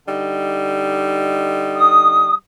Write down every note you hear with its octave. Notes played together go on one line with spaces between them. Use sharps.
D3 G3 D#4
D#6